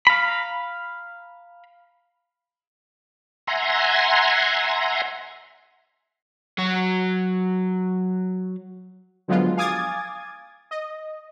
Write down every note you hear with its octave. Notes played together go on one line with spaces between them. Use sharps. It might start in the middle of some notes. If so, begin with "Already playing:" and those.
F5 A#5 B5
E5 F#5 G#5 A#5 C6
F#3 F#4
D3 F3 F#3 G#3 B3 F4
F5 G#5 D6 D#6 G#6 A6
D#5